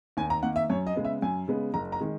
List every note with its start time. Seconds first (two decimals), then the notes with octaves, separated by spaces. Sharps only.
0.17 D#2 G#5
0.30 A#5
0.43 D#3 A#3 F#5
0.56 E5
0.70 F#2 C#5
0.87 D#5
0.96 C#3 G#3 B3
1.04 E5
1.22 F#2 G#5
1.48 C#3 G#3 B3
1.74 F#1 A#5
1.92 A#5
2.01 D#3 G#3